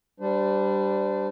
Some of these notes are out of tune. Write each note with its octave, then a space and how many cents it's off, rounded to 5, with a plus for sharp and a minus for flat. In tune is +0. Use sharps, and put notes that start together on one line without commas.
G3 -5 D4 +0 C5 -35